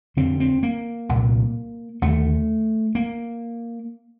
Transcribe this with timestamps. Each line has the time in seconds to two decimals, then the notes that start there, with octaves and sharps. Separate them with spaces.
0.17 F2 D3 C4
0.40 C4
0.63 A#3
1.09 C2 A#2
2.02 D#2 D3 A3
2.95 A#3